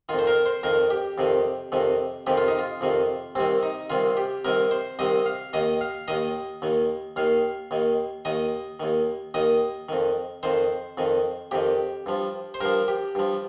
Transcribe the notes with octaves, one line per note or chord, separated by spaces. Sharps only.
F2 D#3 F4
C5
A#4
C5
F2 D#3 A#4
G4
F2 C3 D#3
F2 C3 D#3
F2 C3 D#3 G4
F4
D#4
F4
F2 C3 D#3
C2 C3 D#3 C4
D#4
C2 C3 D#3 F4
G4
C2 C3 D#3 A#4
C5
C2 C3 D#3 D#5
F5
D#2 D#3 D#5
F5
D#2 D#3 D#5
D#2 D#3
D#2 D#3 F5
D#2 D#3
D#2 D#3 D#5
D#2 D#3
D#2 D#3 D#5
F2 D#3
F2 D#3 C5
F2 D#3
F2 D#3 G4
G2 F3
C5
G2 F3 A#4
G4
G2 F3